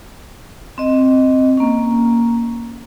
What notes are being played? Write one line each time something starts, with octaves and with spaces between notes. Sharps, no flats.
C4 D#5
A#3 C#4